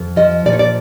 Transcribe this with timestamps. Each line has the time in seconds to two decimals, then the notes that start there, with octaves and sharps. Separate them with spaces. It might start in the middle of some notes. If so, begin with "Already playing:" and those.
Already playing: F2
0.16 F3 D#5
0.46 A#2 D5
0.53 C#5
0.59 D5